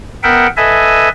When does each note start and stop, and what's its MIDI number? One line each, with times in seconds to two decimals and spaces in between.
0.23 0.47 59
0.23 0.47 70
0.23 0.47 76
0.23 0.47 78
0.23 0.47 79
0.57 1.09 69
0.57 1.09 71
0.57 1.09 75
0.57 1.09 76
0.57 1.09 80